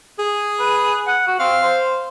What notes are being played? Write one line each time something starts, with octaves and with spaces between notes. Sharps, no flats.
G#4
B4
F#5
F#4
C4 F5
C5